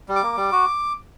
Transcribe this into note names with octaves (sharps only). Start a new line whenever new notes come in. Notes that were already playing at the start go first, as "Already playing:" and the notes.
G3
D6
A#3
G3
F#4